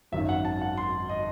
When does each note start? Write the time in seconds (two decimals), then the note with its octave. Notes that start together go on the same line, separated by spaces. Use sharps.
0.12 G#1 F#2 D#3 E5
0.29 F#5
0.45 A5
0.61 F#5
0.77 C6
1.09 D#5